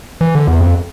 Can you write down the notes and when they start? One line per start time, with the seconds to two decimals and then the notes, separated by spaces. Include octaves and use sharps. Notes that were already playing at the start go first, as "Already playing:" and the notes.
0.21 E3
0.35 D3
0.47 E2
0.61 F2